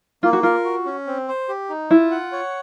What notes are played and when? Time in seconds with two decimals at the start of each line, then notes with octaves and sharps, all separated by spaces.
0.23 A#3 F4
0.33 F#4
0.43 F4 A#4
0.65 F#4
0.86 C#4
1.07 C4
1.28 C5
1.49 G4
1.69 D#4
1.90 E4 F4
2.11 F#5
2.32 C#5